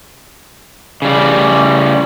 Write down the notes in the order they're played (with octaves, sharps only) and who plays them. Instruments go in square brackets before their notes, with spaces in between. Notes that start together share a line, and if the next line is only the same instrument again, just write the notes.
[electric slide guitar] C#3 G3